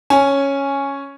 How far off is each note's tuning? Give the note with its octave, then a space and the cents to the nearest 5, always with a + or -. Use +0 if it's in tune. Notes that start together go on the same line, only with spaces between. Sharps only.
C#4 +0 G#5 +0